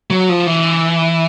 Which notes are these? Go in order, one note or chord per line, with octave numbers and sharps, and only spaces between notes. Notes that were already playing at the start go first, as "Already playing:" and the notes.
F#3
F3
E3